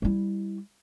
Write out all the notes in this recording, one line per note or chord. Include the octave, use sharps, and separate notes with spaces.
G3 E4